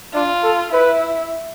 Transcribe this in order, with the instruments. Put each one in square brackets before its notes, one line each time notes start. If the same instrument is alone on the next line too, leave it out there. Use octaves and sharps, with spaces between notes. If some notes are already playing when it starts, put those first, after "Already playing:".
[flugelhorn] D4 [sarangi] F4
[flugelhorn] A4
[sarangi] E4 [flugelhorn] B4